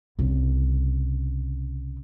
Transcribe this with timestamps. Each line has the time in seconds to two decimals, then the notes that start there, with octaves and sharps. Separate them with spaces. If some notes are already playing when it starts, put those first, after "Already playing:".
0.19 C2 C#3